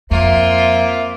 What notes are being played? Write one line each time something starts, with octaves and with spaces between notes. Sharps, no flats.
F2 A#3 C4 F4 E5